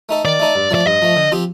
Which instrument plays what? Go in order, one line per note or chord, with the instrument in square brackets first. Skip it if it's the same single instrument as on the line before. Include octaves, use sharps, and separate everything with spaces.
[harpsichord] A3 D#4 A4
[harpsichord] D#3 [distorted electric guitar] D5
[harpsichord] A3 D#4 A4
G2
[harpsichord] F3 A3 [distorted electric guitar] D5
[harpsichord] G2 [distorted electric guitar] D#5
[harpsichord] F3 A3
D3
F3 C4 G4